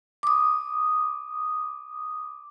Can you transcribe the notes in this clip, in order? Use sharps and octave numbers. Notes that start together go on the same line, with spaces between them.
D6 D#6